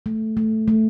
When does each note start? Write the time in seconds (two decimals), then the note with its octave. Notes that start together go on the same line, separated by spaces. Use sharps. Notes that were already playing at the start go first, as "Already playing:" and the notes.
0.06 A3
0.37 A3
0.68 A3